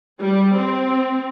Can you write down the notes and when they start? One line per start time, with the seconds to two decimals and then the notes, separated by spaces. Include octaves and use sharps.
0.21 G3
0.58 C4